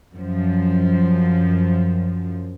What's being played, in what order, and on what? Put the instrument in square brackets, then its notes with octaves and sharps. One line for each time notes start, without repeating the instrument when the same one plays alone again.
[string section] F#2 F3